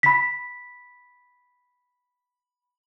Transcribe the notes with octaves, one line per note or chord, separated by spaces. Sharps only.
B5 B6